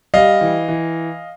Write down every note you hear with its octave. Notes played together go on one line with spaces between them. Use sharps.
G3 D#5 F5
E3
E3